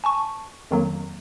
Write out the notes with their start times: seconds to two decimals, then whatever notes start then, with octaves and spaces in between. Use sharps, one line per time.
0.04 G#5 A5 C#6
0.71 F2 D#3 F#3 A#3